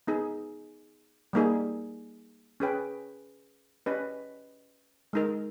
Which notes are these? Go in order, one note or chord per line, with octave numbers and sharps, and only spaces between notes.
B3 D#4 G#4
G3 A#3 D#4 G#4
C#4 G#4 B4 G5
C#4 G4 B4 D#5
G#3 D#4 A#4